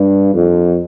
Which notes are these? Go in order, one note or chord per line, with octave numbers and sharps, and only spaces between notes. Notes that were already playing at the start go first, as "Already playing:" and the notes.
Already playing: G2
F2